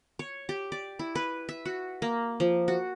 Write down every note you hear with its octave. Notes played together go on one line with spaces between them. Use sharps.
C#5
G4
D5
E4
B4
E5
F#4
A#3
F3
F#4